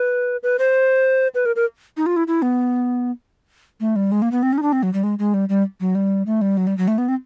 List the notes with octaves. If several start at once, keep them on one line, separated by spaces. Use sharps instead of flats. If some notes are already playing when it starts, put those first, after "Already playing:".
Already playing: B4
B4
C5
B4
A#4
A#4
D#4
F4
E4
E4
B3
A3
G3
G#3
A#3
B3
C4
C#4
D#4
D4
C4
F#3
G3
G#3
G#3
G3
G3
F#3
G3
A3
G3
F#3
G3
F#3
A3
B3
C4